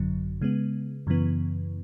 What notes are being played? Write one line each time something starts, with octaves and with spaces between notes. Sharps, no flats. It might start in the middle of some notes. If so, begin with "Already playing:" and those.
Already playing: G#1 F#2 D3 F#3
C#3 G#3 B3
F#2 C#3 E3 B3